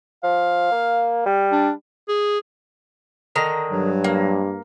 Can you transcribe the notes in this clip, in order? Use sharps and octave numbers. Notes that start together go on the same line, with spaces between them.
F3 F5
A#3
G3
D4
G#4
D3 D#3 A#5
G2 F#3
A#3